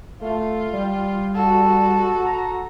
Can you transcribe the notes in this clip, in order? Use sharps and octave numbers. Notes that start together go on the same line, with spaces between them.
A3 F4
G3
F#4 A4
A#5